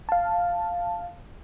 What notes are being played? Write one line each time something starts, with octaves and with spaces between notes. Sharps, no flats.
F5 A5